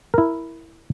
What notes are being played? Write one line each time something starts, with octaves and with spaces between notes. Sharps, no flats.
E4 A#4